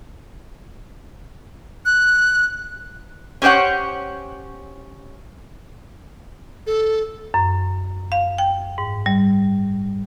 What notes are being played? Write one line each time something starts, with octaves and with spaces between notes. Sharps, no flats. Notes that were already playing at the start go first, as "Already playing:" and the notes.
F#6
C#4 G4 C5 C#5 F#5
A4
F#2
F5
G5
G#2
G3